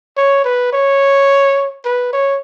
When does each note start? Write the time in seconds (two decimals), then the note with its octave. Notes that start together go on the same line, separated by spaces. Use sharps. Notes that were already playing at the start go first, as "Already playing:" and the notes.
0.17 C#5
0.45 B4
0.73 C#5
1.85 B4
2.13 C#5